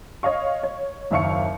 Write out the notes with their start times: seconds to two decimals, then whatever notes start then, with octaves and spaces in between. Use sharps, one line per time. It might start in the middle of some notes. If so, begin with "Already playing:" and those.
0.23 C#5 D#5 F5 C#6
0.63 C#5
1.11 F#1 D#2 E5 F5 C#6 C#7